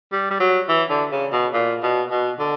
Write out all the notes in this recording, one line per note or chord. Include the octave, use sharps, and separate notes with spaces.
G3
G3
F#3
E3
D3
C#3
B2
A#2
B2
B2
D3